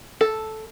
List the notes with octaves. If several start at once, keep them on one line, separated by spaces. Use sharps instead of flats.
A4